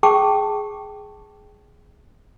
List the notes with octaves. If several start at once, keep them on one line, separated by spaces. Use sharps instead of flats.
G#4 G5 A5 C#6 D6